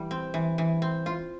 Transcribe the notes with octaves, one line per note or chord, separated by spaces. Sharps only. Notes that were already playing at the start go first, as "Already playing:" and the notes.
Already playing: E3 G3
C4
E3
E3
C4
F4